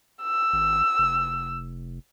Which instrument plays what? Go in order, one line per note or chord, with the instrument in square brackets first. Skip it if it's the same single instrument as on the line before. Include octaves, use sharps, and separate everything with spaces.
[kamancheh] E6
[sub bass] G#1
F1